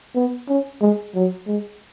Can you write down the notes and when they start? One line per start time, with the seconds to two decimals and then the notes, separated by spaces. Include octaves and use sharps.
0.15 B3
0.48 C#4
0.81 G#3
1.15 F#3
1.47 G#3